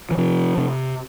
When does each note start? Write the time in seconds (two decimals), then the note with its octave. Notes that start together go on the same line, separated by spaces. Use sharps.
0.11 E3
0.17 C3 F3
0.57 C3